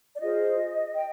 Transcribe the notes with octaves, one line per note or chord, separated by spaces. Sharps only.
D5
F4 G#4 C5 D#5
G5